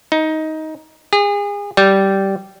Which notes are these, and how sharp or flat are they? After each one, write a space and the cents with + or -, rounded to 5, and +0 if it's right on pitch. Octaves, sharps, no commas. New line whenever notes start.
D#4 +15
G#4 -35
G3 -10